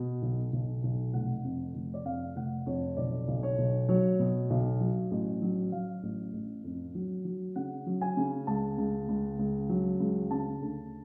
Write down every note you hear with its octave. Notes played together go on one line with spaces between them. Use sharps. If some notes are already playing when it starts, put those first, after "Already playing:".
Already playing: B2
B1
B1
B1
F1 F#5
F2
F1
D5
F2 F5
F1 F#5
F2 C#5
B1 D5
B1
C#5
B1
F#3 C#5
B2
B1
F#3
A1
F#3
F#3 F5
A1
A1
F2
F#3
F#3
C#3 F#5
F#3
G#5
C#3
C#2 A5
C#2
C#2
C#2
F#3
C#2
C#3 A5
D2